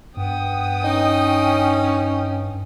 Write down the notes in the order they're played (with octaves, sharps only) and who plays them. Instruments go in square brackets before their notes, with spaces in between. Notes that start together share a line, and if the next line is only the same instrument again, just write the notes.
[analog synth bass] G2 [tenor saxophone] B3 [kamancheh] G5 D#6
[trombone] C#4 [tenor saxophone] D#4